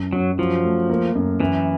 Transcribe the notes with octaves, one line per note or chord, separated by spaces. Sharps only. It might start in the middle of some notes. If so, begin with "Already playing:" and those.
Already playing: F#2
F#2 F#3
F3 F#3
A3
A#3
F#2
F#2 E3